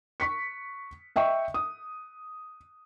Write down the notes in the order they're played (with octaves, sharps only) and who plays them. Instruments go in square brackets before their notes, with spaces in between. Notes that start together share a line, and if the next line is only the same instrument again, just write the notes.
[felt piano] C#6 B6 C#7
D#5 E5 G5 C#6
D#6